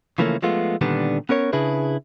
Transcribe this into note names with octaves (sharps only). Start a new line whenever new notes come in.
C#3 E3 F3 A3 A#3 C#4
F3 G#3 A3 B3 F4
A#2 D3 D#3 G3 B3 D4
B3 C#4 A#4 C#5
C#3 D4 E4 G#4 B4